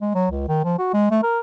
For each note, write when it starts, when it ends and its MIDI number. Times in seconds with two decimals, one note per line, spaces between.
0.01 0.10 56
0.15 0.28 54
0.31 0.45 37
0.48 0.63 51
0.64 0.77 53
0.78 0.89 66
0.94 1.10 56
1.11 1.20 57
1.23 1.40 70